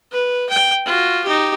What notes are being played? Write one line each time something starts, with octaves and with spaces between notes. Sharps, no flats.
B4
G5
F4 F#4
D#4 G4